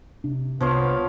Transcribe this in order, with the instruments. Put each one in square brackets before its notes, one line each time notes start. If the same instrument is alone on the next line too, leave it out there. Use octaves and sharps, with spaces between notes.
[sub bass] C3 [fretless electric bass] D4
[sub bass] C2 [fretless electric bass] C3 [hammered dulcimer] F3 C#5 F5 [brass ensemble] B3